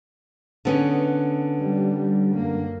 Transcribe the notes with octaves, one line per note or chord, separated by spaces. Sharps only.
D3 B3 C#4
G3
F#2 A#3